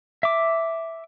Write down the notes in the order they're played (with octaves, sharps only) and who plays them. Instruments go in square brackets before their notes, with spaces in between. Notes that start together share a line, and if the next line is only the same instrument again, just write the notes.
[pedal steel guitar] E5 D6